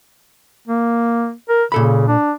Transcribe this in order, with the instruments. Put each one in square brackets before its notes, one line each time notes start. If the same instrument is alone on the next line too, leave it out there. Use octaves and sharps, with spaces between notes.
[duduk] A#3
A#4
[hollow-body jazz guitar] A#2 A4 B5 [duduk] C#3
[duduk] D4